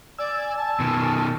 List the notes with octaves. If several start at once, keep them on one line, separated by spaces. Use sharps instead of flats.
D5 G#5 E6
A5
B2 D#3